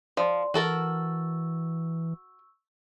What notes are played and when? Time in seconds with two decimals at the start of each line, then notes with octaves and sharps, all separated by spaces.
0.17 F3 D5 C6
0.54 E3 F#4 A4 A#4 C#6 E6